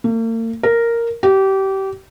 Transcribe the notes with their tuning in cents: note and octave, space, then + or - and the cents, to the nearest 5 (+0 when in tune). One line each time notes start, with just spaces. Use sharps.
A#3 -45
A#4 -5
G4 -25